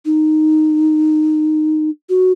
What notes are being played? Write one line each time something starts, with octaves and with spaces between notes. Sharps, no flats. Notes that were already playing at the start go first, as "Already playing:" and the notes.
D#4
F#4